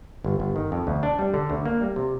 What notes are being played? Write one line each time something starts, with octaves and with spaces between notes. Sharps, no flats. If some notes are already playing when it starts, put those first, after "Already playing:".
G1
G1
D#3
F2
D2
D4
G3
D3
D2
A#3
G3
C3